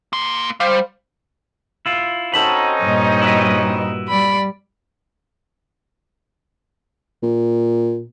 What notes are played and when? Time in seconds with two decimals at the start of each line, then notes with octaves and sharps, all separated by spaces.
0.13 A#3 C6
0.60 G3 C5 F5
1.86 E4 F4
2.34 C4 C#4 D#4 F#4 A4 A5 B5
2.83 G2 A#2 D#5
3.22 E4 F#4 B4
4.08 G3 D5 B5
7.23 A#2